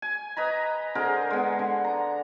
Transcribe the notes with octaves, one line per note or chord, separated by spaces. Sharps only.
G#5
B4 D#5 A#5 B5
D3 G#4 A#4 C5
G#3 B3
D3
A#5